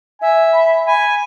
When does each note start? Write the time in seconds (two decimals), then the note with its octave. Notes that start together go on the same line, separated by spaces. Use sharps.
0.22 E5 G#5
0.53 B5
0.86 G#5 B5